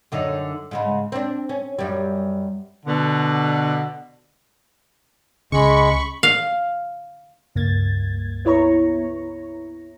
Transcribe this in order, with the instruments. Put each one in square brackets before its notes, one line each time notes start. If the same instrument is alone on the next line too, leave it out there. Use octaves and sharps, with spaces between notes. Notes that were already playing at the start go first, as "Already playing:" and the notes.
[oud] F#2 D3 D#4
G#2 C#3 G#3
C4 D4
C#4
F#2 G3
[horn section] B2 D3
[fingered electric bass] C#2 C#3 [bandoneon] G#3 [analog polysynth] B5 C#6
[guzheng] F5
[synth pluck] C#2 G2 A#3 G#6 A6
B3 E4 C#5 A#5 C#6